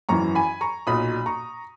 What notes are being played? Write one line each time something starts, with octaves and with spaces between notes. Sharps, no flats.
G#1 F#2 E3 A#5 C#6
G#5 B5
A#5 C#6
B1 A#2 F#3 B5 D#6
A#5 C#6